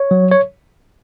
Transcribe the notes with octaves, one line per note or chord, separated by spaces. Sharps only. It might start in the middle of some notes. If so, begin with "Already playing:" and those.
Already playing: C#5
F#3
C#5